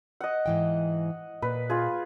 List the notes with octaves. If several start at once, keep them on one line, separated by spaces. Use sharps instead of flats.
D#5 F#5
G#2 E3 G5
A#2 B4
F4 G#4